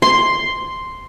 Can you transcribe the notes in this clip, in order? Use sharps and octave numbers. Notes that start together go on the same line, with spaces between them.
C6